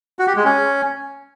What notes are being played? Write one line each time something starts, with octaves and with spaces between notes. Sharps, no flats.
F#4
G4
G#3
C#4